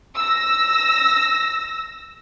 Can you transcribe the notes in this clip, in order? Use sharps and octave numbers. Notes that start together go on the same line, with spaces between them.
E6 A#6